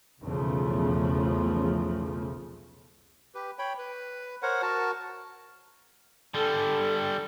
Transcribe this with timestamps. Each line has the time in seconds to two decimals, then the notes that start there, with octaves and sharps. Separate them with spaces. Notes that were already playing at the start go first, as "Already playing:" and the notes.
0.21 B1 E2 C#3 F3 A3
3.35 G4 B4
3.59 C#5 G5 B5
3.78 B4
4.42 A#4 C5 C#5 F#5
4.62 F#4 A#4 A5
6.34 D3 G3 A4